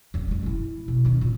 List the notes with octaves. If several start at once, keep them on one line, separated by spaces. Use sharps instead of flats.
F1 F#2
F#1 G#3
A#2 E4
B2
C#2 D#3
A#2 F4